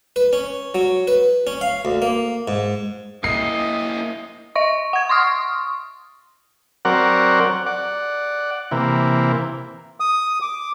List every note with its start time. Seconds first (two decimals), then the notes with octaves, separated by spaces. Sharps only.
0.16 B4
0.33 C#4
0.75 F#3
1.08 B4
1.47 C#4
1.61 F5
1.85 D2
2.02 A#3
2.48 G#2
3.24 A#3 E4 D#5 C7
4.55 D#5 E5 C#6
4.93 F#5 G#6
5.09 C6 C#6 D#6 F6
6.85 F#3 C4 A#4 D5 F#5
7.66 D5 F#5
8.71 C3 E3 A#3
10.00 D#6
10.42 D6